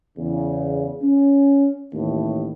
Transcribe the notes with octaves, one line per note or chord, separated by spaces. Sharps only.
E2 C#3
C#4
A1 D#2 A2